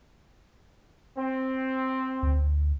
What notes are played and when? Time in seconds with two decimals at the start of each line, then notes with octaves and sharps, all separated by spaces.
1.16 C4
2.23 D2